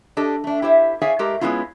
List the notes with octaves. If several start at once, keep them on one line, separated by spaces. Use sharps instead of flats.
D4 G4 A4 D#5
A3 D4
E4 G4 C5 E5
G#4 C#5 D5 E5 F5 G#5
G#3 A3 G4 A#4
G#3 B3 C#4 E4 F4